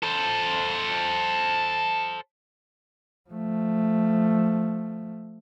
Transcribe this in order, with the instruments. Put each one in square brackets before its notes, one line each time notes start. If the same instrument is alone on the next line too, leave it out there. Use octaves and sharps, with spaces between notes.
[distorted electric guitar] A4 C5
[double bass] F3 A3